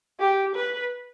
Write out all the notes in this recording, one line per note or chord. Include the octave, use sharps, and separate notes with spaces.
G4
B4